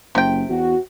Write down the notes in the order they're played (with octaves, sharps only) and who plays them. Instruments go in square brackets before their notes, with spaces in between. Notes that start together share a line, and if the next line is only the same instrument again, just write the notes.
[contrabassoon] F#1 [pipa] C3 G5
[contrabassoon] E2 [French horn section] F#4